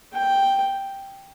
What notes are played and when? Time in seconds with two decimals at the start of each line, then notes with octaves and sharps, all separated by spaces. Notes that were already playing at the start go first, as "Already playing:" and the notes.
0.13 G5